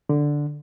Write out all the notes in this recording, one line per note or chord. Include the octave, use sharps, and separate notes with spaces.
D3